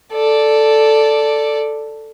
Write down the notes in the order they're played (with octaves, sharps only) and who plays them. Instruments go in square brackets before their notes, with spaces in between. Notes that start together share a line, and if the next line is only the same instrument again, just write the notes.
[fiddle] A4 D5